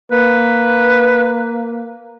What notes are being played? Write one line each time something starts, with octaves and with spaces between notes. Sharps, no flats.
A#3 B4